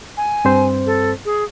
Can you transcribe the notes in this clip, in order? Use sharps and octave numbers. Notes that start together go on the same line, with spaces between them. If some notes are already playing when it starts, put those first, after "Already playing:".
G#5
G2 C4 C5
A4
G#4